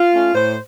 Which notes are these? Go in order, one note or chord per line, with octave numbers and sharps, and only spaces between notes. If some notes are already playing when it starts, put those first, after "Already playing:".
Already playing: F4
A3 C#4
A2 C5